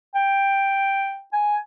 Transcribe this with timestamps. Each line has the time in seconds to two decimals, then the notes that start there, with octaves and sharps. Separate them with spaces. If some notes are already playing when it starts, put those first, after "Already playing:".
0.15 G5
1.33 G#5